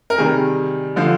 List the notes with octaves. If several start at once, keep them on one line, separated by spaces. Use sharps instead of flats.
A#4
C3 D#3 G3 G#4
D3 F3